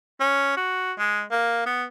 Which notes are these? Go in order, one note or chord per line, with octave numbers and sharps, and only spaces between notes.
C#4
F#4
G#3
A#3
B3